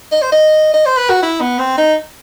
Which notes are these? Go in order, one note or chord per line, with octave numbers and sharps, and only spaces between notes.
D#5
C5
D#5
D#5
C5
B4
F#4
E4
B3
C4
D#4